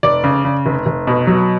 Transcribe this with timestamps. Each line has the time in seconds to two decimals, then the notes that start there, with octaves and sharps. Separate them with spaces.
0.03 F1 D5
0.24 C#3
0.45 C#3
0.66 F1
0.86 F1
1.07 B2
1.27 F#3